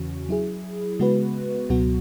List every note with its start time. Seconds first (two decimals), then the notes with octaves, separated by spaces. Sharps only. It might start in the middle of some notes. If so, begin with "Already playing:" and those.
Already playing: E2 C#3 E3 C#4 F#4
0.29 F#3 E4 G#4
0.99 C#3 G#3 B3 F#4 B4
1.69 C#2 B2 F#3 B3 F#4